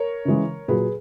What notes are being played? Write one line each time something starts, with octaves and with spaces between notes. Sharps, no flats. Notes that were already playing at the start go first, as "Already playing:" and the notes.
Already playing: A#4 C#5
C#3 E3 G#3
A#2 F#3 G#4 B4